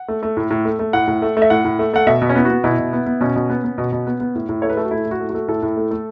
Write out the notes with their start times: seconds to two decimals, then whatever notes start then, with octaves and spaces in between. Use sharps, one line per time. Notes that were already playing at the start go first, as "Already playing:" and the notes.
Already playing: F#5
0.08 A3
0.23 A3
0.37 A2
0.50 A2
0.65 A3
0.79 A3
0.93 A2 F#5
1.07 A2
1.22 A3
1.37 A3
1.42 E5
1.50 A2 F#5
1.64 A2
1.79 A3
1.93 A3 F#5
2.07 B2 E5
2.21 B2
2.29 C#4
2.35 B3 E4
2.45 F#4
2.50 B3
2.64 B2 E4
2.78 B2
2.93 B3
3.06 B3
3.21 B2 C#4
3.36 B2
3.50 B3
3.64 B3
3.78 B2
3.92 B2
4.07 B3
4.20 B3
4.35 A2
4.49 A2
4.62 A3 C#5
4.70 B4
4.77 A3 A4
4.84 F#4
4.91 A2 E4
5.05 A2
5.11 F#4
5.20 A3
5.29 F#4
5.35 A3
5.48 A2 A4
5.62 A2
5.77 A3
5.91 A3